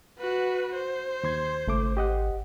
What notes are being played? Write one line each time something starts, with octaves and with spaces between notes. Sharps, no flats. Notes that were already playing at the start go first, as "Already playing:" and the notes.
F#4 B4
C5
D#2 C6 G#6
G#1 C#2 A3 D6
G4 D#5 F#5